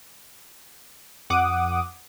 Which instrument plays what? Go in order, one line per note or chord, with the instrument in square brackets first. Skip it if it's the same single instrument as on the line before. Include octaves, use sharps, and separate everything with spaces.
[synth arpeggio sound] F2 F#5 D6 D#6